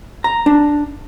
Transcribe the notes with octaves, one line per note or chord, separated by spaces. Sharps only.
A#5
D4